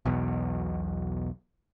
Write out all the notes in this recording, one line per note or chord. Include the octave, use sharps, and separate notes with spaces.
B1 E2 B2